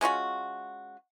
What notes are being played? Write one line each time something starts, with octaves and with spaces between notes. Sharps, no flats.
G#3 C#4 F4 F#4